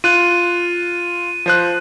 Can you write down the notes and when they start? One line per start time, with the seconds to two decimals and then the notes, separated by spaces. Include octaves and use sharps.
0.04 F4 F#6 D#7
1.46 F3 C5 F#6